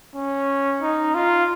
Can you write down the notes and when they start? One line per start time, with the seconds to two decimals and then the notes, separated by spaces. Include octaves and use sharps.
0.15 C#4
0.82 D#4
1.15 F4